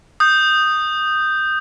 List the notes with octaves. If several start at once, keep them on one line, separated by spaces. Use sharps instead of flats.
D#6 G6